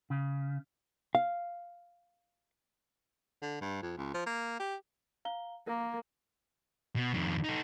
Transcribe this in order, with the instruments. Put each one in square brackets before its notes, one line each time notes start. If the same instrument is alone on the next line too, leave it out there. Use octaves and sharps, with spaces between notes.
[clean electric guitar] C#3
[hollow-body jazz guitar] F5
[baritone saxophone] D3
G2
F2
C#2
F3
A#3
G4
[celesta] F5 A#5 G7
[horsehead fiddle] A#3 [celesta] A#4
[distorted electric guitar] B2
F2 D#3
D#4 A4